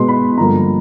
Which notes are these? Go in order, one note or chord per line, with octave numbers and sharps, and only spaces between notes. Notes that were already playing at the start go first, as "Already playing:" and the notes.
Already playing: B2 G#3 B3 C6
B5
G2 D3 F3 A#3 A#5